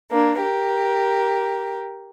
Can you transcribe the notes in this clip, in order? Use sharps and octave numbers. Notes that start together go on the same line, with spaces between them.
A#3 D4
G4 A#4